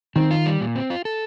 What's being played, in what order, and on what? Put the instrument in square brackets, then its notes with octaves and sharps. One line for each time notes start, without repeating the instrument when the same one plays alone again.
[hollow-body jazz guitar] D#3 [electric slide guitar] C4
[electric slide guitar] F4
G3
A#2
C4
F4
A4